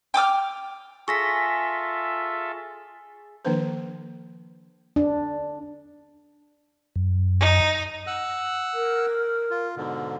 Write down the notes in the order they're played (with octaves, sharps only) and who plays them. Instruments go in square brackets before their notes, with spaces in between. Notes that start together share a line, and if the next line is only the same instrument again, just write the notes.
[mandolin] G5 D6 D#6 F6
[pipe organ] F4 A4 E5 [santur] G#4 [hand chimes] C#6 A#6 B6
[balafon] D#3 F3 A#3 D4 B4 C5
[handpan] D4
[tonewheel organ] F#2
[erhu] D#4
[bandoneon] F#5 E6 F#6
[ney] A#4
[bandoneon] F4
G#2 B2 D3